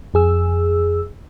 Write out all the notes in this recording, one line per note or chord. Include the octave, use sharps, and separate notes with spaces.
F2 G#4 E6